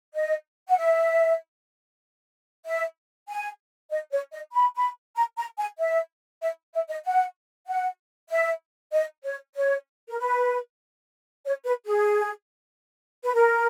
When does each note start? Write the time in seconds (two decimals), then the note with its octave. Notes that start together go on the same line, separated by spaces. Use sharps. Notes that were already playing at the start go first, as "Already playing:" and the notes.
0.15 D#5
0.68 F#5
0.77 E5
2.65 E5
3.29 G#5
3.90 D#5
4.12 C#5
4.32 D#5
4.53 B5
4.76 B5
5.16 A#5
5.38 A#5
5.59 G#5
5.79 E5
6.42 E5
6.74 E5
6.89 D#5
7.05 F#5
7.67 F#5
8.30 E5
8.93 D#5
9.24 C#5
9.56 C#5
10.09 A#4
10.19 B4
11.45 C#5
11.65 B4
11.86 G#4
13.24 B4
13.33 A#4